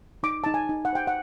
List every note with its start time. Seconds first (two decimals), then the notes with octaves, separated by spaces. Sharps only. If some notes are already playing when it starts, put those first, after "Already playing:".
0.23 D#4 D6
0.44 D#4 A5
0.54 G#5
0.69 D#4
0.85 F#5
0.93 C5 G5
1.07 F#5